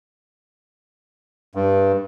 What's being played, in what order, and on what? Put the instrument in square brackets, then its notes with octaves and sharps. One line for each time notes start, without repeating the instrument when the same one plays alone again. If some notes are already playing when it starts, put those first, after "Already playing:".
[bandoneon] G2